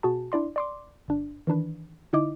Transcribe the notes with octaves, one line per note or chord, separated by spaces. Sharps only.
B2 F#4 G#4 A5
D4 E4 D5 C6
D5 C6 D6
G1 D4
D#3 E3 D4 B4
D3 D#4 E4 D#5 D6